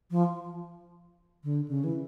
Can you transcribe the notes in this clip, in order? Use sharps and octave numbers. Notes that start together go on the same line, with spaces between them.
F3
D3
C#3
E3